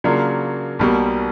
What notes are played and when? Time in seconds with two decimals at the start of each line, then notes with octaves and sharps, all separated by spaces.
0.04 C#3 F#3 A#3 D4 F4
0.79 B1 B2 G3 A#3